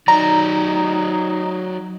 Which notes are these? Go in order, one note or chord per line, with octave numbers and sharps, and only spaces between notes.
F#3 D#4 D5 A#5